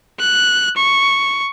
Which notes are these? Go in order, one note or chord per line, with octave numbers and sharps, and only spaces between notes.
F#6
C#6